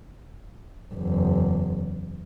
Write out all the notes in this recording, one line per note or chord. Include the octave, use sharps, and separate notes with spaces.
F#1 E2